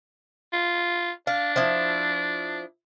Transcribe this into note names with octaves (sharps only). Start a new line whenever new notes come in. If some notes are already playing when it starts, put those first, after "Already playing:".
F4
D4 F5
F3 E4